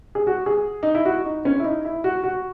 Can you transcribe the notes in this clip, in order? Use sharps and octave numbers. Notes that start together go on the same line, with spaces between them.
G#4
F#4
G#4
D#4
E4
F#4
D#4
C#4
E4
D#4
E4
F#4
F#4